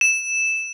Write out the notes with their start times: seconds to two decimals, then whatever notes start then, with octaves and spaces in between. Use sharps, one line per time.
0.01 E7